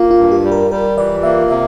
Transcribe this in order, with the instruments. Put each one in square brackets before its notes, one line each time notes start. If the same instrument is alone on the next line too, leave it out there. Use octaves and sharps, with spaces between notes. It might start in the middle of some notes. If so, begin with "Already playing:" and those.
Already playing: [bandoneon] A#3 [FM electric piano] F4
[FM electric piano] F4
[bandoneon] G2
[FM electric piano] G4
[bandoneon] G3
[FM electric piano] A#4
[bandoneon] G3 [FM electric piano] A#4
[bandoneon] E3 [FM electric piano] D5
[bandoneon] A#3 [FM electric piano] E5
[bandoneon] C3 [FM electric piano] E5